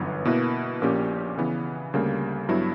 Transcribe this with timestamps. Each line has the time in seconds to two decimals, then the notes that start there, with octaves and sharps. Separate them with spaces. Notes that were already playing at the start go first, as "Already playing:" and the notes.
Already playing: G1 F#2 E3 B3
0.25 B2 A#3 E4 B4
0.82 A#1 A#2 A#3 C#4 G4
1.37 C#3 E3 B3
1.94 D2 C#3 G3 A#3
2.49 G2 F#3 B3 E4